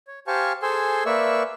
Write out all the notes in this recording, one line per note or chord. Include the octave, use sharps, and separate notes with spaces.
C#5
G4 C5 F5 G#5 A5 C#6
G#4 A4 C5 G#5 C6 E6
A#3 B4 D5 E5 C#6 E6